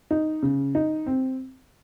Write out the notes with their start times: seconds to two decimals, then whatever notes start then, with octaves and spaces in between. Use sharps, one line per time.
0.11 D#4
0.43 C#3
0.75 D#4
1.06 C4